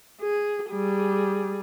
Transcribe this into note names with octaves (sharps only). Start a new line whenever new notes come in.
G#4
G3 G#4